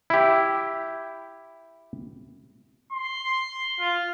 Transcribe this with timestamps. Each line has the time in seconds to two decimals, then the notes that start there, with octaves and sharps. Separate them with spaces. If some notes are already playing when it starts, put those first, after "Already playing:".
0.10 E4 G4
2.92 C6
3.79 F4